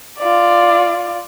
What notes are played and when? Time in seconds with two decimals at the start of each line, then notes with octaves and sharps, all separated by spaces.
0.19 F4 D5